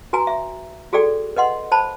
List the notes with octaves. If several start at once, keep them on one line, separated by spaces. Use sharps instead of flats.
F#4 B4 G#5 A#5
E5
F#4 G#4 A4 D5 G5
B4 D#5 F#5 C6
C5 A5 B5